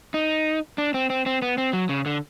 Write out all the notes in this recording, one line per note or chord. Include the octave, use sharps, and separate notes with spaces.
D#4
D4
C4
C4
C4
B3
C4
F#3
C#3
D3